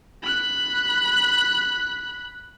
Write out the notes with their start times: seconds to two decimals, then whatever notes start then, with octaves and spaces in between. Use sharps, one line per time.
0.23 B5 F#6